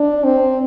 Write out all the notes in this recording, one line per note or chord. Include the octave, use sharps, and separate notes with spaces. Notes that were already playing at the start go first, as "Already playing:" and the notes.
Already playing: D4
C4